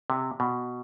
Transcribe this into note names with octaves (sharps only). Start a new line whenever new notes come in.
C3
B2